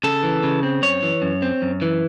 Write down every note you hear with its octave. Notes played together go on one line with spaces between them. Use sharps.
C#3 A4
E3
C#3
C4
F#2 C#5
E3
F#2
C4
F#2
E3